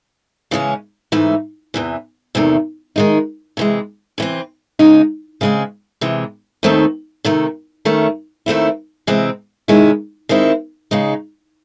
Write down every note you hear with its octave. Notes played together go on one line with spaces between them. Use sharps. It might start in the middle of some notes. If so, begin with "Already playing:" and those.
C#3 E3 G#3 C#4
G#2 E3 A3 D#4
E2 C3 E3
E2 C3 D#3 A3
D#3 G#3 D#4
C3 E3 G#3
C3 E3 C4
C#3 G#3 D#4
C#3 G#3 C4
C3 E3 G#3
D#2 D#3 A3 C4 D#4
C3 D#3 A3
F#2 D#3 A3 C#4
D#2 D#3 A3 C4 E4
C3 E3 G#3 C4
C3 D#3 G#3 C#4 E4
D#3 G#3 C4 E4
C#3 G#3 D#4